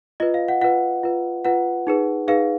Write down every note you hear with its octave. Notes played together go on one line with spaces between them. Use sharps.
F4 B4 D#5
F5
F#5
F4 B4 F#5
F4 B4
F4 B4 F#5
D#4 G#4 B4
D#4 G#4 B4 F5